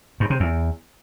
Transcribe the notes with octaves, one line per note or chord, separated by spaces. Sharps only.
G2
C3
E2